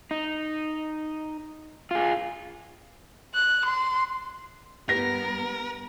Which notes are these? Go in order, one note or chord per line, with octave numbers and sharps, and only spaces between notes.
D#4
F4 G#4
F#6
C6
G2 B3 G4 A#4 B4 A#6